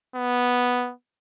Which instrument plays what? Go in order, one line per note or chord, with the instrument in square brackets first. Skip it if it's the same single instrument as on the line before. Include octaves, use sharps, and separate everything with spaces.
[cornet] B3